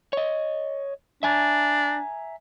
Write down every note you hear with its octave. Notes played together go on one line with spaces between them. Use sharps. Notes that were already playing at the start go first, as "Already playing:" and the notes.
C#5 D#5
D4 E5 G#5 A#5